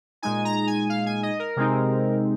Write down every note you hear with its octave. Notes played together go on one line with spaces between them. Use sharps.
A#2 G#3 D#4 G#5
A#5
G#5
F5
G#5
D#5
A#4
C3 G#3 C4 D#4